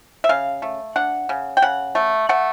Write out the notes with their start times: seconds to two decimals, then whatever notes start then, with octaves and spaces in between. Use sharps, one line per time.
0.24 E5
0.29 C#3 F5
0.62 A3
0.96 D4 F#5
1.29 C#3
1.57 G5
1.62 C#3 F#5
1.95 A3
2.29 A3 F#5